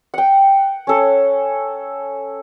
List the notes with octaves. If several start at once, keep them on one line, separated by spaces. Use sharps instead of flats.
F#5 G5
C#4 A4